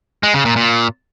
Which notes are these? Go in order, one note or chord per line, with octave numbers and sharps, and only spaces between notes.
G#3
C#3
A#2
A#2